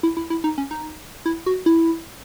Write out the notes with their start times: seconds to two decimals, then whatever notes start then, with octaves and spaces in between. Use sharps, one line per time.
0.03 E4
0.17 E4
0.30 E4
0.44 D#4
0.58 C#4
0.71 D#4
1.26 E4
1.46 F#4
1.66 E4